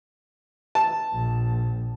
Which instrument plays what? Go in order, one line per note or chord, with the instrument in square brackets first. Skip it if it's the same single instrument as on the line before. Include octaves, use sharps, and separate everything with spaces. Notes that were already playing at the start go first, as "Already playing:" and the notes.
[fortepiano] A5
[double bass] A#1